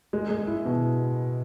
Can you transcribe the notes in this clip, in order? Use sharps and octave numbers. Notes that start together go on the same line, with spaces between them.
G#3
G#3
E4
B2